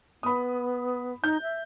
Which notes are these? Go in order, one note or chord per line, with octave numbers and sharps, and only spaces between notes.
B3 B5 D#6
D#4 G6
E5